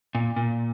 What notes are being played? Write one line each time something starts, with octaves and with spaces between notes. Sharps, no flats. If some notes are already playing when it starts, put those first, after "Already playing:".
A#2
A#2